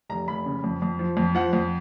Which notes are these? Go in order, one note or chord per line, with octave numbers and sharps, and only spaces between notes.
F1 A#5
F1 B5
C#3
F2
F2
F3
F2
F3 F#5
F2